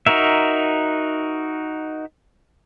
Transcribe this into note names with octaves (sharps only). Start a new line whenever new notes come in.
D#4 F#4 A#4 E5